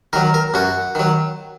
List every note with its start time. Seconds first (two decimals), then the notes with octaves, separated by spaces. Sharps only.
0.13 D#3 F#3 A#4
0.34 A#4
0.54 F#2 F#4
0.95 D#3 F#3